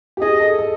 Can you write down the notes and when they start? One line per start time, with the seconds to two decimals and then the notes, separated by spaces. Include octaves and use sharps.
0.17 G4
0.21 G#4 D#5
0.40 A4
0.59 A4